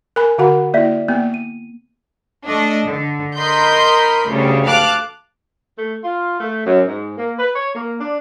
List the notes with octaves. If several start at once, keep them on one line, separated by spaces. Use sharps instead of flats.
A#4 G#5 B5
D3 F#4 A#4 F5 F#5 B5
A#3 E4 D5 E5 B6
A#3 B3
D#7
A3 D4 D#5
D3
A#4 D#5 B5 C6 G6
D2 C#3 G3
F5 A5 D6 F#6
A3
F4
A3
F#2
G#2
A#3
B4
C#5
A#3
D4